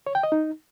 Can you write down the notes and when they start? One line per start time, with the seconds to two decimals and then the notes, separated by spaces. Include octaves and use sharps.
0.07 C#5
0.15 G5
0.23 D#5
0.32 D#4